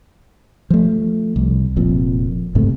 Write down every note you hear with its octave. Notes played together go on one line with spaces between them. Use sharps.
F3 A3
C2
F1 F2 A#2
F#1 G#2 C3 A3